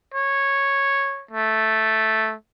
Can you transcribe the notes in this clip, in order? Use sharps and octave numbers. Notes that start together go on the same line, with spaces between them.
C#5
A3